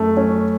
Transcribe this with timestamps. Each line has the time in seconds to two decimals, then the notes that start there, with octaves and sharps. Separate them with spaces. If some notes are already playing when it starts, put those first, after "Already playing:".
Already playing: F#2 A3
0.17 C#4